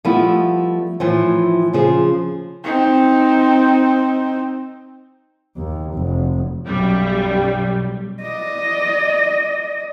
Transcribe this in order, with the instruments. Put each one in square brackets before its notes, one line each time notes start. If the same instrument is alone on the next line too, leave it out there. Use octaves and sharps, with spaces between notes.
[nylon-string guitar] F3 G3 A3 B3 E4
A2 E3 F3
C#3 F3 G#4
[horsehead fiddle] C4 D#4
[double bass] D#2
F1
[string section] B1 F#2 G3
[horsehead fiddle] D5 D#5